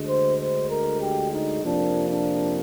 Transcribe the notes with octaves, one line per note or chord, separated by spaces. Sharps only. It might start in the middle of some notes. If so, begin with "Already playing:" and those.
Already playing: D2 D3 G#3
C5
C5
A#4
G4
D#4
F2 C3 F3 A#3 D4
D4